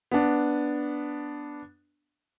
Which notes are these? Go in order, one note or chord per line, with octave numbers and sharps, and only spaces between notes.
B3 D4